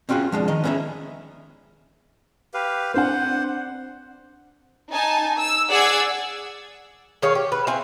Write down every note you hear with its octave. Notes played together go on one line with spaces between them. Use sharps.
C4 C#4 F4 F#4 G#4
F3 G#3 D4
D#3 D#5
B3 C#4 G#4 C#5 E5
G4 B4 F5
C4 D4 C5 F#5
D#4 G#5 A5
E6
G#4 D5 F#5 E6 G#6
D#3 G#4 C#5 F5
G4
B4
C4 E5 F5 G#5